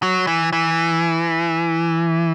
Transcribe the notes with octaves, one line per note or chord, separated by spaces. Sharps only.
F#3
E3
E3